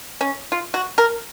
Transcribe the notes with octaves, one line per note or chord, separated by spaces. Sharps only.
C#4
F4
F#4
A#4